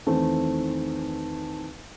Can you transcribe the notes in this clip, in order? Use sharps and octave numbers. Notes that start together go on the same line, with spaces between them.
E2 D#3 A3 C4